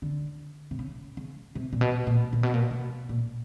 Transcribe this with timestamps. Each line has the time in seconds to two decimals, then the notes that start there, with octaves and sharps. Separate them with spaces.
0.02 D3
0.71 C3
0.79 C#3
1.17 C#3
1.55 C3
1.73 A#2
1.81 B2
2.07 A#2
2.33 A#2
2.43 B2
2.54 A#2
2.71 B2
3.09 A#2